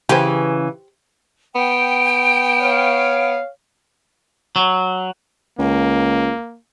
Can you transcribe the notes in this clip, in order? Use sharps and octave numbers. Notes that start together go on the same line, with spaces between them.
C#3 E3 G4 C5
B3 G5
C#5 F5
F#3
C#2 A#3